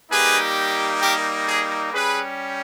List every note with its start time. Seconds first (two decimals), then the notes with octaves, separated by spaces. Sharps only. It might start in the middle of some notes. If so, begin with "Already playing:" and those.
0.11 G3 A#3 D#4 G4 G#4 B4
1.02 G4 A#4
1.48 G#4
1.93 G3 C#4 G4 G#4 B4